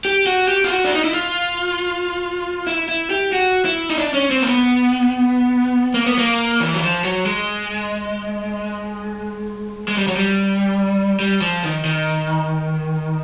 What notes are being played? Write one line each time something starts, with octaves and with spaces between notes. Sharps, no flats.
G4
F#4
G4
F4
F#4
D4
D#4
E4
F4
E4
E4
G4
F#4
E4
D#4
D4
C#4
C4
A#3
B3
A#3
B3
A#3
E3
F#3
F3
F#3
G#3
G#3
G3
F#3
G3
G3
F3
D#3
D#3